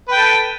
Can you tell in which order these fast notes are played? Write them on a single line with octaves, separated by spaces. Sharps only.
B4 G5 A4